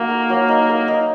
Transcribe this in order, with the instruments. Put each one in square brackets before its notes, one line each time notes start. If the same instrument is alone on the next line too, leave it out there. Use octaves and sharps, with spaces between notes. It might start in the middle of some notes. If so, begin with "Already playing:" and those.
Already playing: [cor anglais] A#3 [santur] D#4 F#4
[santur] A#4
F#3
D#4
A#4
D#4